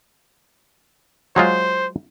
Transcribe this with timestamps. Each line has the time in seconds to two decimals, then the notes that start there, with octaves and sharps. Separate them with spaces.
1.36 F#3 G#3 F4 C5